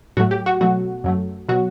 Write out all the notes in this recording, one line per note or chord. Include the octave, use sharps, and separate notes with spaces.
A2 F#3 A3 F#4
G4
F#4
B2 F#3 A3 F#4
F#2 F#3 A3
B2 F#3 F#4